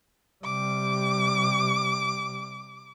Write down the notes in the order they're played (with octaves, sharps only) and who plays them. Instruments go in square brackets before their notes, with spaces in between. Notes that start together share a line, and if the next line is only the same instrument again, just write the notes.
[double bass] C3 G3 [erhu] D6